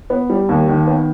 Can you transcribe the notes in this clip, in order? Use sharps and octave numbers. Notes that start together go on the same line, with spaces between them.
B3
G3
D#2
D#3
B3